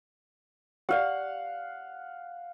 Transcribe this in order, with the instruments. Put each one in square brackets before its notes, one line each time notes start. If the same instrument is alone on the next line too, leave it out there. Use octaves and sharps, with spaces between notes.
[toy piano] G4 D5 [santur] F5 F#5